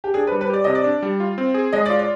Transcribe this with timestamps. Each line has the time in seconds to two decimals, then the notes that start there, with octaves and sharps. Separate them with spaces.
0.04 G4
0.14 D4 G#4
0.27 B4
0.32 G3
0.41 B4
0.50 G4 D5
0.64 C3 D#5
0.75 D5
0.84 D4
1.03 G3
1.20 F4
1.38 C4
1.54 G#4
1.73 G#3 D#5
1.85 D5
1.90 F4
1.99 D5